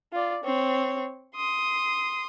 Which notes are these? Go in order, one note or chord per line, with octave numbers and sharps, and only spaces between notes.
F4 D5
C4 C#5
C6 D#6